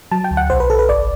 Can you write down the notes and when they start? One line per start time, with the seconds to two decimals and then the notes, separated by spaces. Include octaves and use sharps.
0.11 F#3 A5
0.24 G5
0.31 D2
0.37 F#5
0.50 B1 C5
0.60 B4
0.70 B1 A4
0.79 B4
0.89 G1 D5